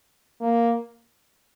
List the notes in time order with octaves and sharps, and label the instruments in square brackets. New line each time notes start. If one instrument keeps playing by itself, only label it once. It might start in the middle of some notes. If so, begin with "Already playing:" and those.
[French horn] A#3